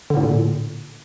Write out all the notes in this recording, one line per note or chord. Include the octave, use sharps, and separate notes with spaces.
D3
A2
A#2